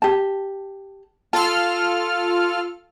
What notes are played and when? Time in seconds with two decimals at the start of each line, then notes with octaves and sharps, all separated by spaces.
0.02 G4 A5
1.33 F4 A4 A5 F6